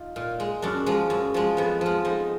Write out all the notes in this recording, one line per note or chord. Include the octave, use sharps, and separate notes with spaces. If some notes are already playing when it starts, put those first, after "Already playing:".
Already playing: D#4 F4
A#2
G#3
F#2 D4
F3 G#3
F#2
F3 G#3
F2 B3
F3 G#3
F2 D#4